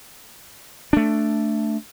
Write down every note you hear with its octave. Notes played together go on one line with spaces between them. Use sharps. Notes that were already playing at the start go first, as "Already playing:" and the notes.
A3 D4